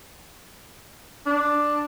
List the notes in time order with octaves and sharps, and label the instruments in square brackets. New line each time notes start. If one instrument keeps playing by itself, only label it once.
[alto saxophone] D4